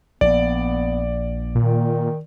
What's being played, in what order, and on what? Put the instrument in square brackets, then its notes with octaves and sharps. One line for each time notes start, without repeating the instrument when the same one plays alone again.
[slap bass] A#1 [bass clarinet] B3 [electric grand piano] D5
[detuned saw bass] A#2 [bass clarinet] D#3